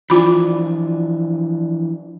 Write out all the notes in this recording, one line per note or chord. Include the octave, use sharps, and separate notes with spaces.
E3 F3 D4 F4 B5